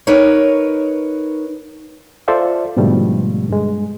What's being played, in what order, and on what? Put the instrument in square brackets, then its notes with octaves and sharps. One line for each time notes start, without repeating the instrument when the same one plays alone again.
[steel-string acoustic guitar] D#4 A#4 B4 C#5
[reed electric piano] F4 A4 C5 D5 E5 F5
G#2 B2 D3 F3 G3 A3
G2 G#3